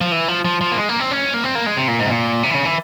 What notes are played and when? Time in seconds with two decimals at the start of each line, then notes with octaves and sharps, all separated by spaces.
0.01 F3
0.12 E3
0.28 F3
0.45 F3
0.61 F3
0.72 A#3
0.78 G#3
0.89 A#3
1.00 C4
1.11 C#4
1.34 A#3
1.44 C4
1.55 A#3
1.66 G#3
1.77 C3
1.88 A#2
1.99 G#2
2.05 C3
2.10 A#2
2.43 C3
2.50 E3
2.54 C#3
2.65 E3